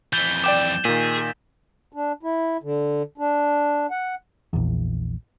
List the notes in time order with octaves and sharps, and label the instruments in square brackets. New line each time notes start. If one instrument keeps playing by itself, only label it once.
[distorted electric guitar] F2 E3 [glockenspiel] G6 A6 G7
[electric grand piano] D5 G5 D6 [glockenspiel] G6 E7
[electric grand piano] A#2 D#3 [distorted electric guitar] G#4 [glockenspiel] B6
[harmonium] D4
E4
D3
D4
F#5
[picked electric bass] A#1 E2